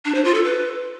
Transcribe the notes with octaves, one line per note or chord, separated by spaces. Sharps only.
D4
C5
F4
A4
B4